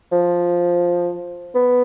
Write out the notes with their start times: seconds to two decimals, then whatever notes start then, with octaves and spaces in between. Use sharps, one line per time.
0.12 F3
1.55 B3